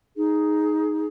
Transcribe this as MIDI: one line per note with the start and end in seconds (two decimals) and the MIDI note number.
0.16 1.06 63
0.16 1.06 68